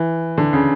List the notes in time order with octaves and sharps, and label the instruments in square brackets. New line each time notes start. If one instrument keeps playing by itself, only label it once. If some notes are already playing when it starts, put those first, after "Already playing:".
Already playing: [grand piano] E3
D3
C#3